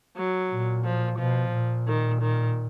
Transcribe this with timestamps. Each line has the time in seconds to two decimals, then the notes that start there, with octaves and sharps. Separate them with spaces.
0.16 F#3
0.50 A#2
0.84 F3
1.18 B2 F3
1.53 A#2
1.87 D#3
2.22 D#3